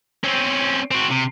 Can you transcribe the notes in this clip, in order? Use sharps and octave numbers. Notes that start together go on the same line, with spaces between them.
C4 C#4
C4 F#4
C3